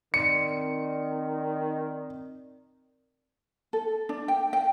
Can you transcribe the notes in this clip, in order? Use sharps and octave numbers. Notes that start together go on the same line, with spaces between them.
D#3 C4 D5 C#7
A4
D4
G5
G5